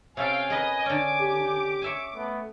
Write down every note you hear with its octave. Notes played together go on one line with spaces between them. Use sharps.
C3 C#4 A4 F5 G5 G#5
G#4 A#4 B4 D#5
D3 C#4 D6
G4
C#5 E5 G#5
A3 B3